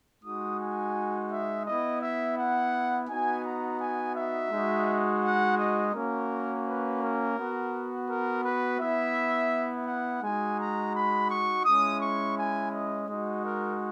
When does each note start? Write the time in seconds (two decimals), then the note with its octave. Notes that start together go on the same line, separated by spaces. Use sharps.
0.23 G#3 D#4 F#4 D#6
0.59 G#5
1.30 E5
1.65 B3 E4 D#5
2.01 E5
2.37 F#5
3.08 B3 D#4 F#4 G#5
3.45 A#5
3.80 G#5
4.15 E5
4.51 G#3 D#4 F#4
5.23 F#5
5.58 D#5
5.94 A#3 C#4 F#4 A#4
6.66 B4
7.01 A#4
7.36 B3 F#4
8.09 A#4
8.44 B4
8.79 B3 E4 E5
9.87 F#5
10.22 G#3 D#4 F#4 G#5
10.58 A#5
10.94 B5
11.30 C#6
11.65 G#3 C#4 E4 D#6
12.01 C#6
12.37 G#5
12.71 D#5
13.08 G#3 D#4 F#4 D#5
13.43 A#4